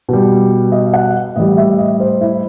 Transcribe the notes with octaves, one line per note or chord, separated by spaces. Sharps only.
B2 G3
D#5
F#5
A2 E3 G3 D#5
E5
D#5
C5
E4